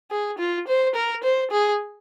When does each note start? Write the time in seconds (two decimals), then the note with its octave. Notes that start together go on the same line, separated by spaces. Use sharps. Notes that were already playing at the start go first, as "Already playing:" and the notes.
0.11 G#4
0.38 F4
0.68 C5
0.95 A#4
1.23 C5
1.51 G#4